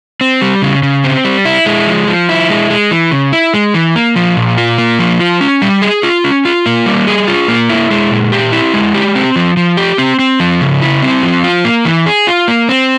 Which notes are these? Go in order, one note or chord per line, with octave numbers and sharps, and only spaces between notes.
C4
G3
C#3
C#3
C4
G3
E4
G#3
F3
F3
E4
G#3
G#3
E3
C#3
E4
G#3
E3
A#3
F3
A#2
F4
A#3
F3
F4
C#4
G3
G#4
F4
C#4
F4
A#3
G3
G#4
F4
A#3
E4
G#3
A#2
G4
E4
G#3
G4
C4
F3
F3
G4
C4
C4
F3
C#3
E4
C4
F3
F4
A#3
E3
G#4
F4
A#3
C4